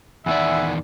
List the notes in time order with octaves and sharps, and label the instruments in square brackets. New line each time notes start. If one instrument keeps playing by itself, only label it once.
[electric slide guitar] E2 D#3 D5 [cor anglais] E5 [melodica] F#5 G#5 B5